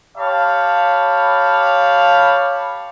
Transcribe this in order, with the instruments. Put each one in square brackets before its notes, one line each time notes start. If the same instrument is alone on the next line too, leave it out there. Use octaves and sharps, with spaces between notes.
[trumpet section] G4 C#5 F5 A5 B5